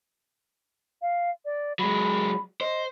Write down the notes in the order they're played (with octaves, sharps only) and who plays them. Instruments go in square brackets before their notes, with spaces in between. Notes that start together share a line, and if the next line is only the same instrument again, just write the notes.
[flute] F5
D5
[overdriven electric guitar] F#3 G#3 [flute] B5
[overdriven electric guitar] C5 [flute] D#5